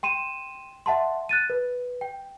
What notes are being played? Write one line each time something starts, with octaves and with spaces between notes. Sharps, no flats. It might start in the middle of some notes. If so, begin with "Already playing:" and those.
G5 C6 D#7 E7
E5 F#5 A5 C6
F#6 A6 D#7
B4
G5